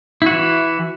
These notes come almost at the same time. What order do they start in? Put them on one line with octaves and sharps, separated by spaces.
E4 F#4 E3